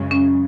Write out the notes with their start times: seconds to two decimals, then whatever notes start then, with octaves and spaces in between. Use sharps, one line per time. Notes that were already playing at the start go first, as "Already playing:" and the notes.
Already playing: F#2 C#3 G#3
0.11 C#4